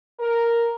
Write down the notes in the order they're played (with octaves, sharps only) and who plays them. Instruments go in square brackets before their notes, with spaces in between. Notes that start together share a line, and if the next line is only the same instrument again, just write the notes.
[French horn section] A#4